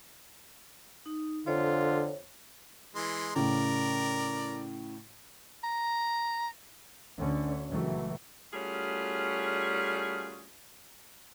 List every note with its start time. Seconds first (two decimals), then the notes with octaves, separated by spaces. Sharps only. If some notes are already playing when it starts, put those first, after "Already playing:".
1.06 D#4
1.47 F2 D3 F4 C#5
2.95 E3 G#3 C6
3.36 A2 C#3 A#4 D5
5.64 A#5
7.18 D2 D3 C#4
7.70 C#2 A#2 E3 F#3 A3
8.53 G3 A3 C#4 F4 F#4 G#4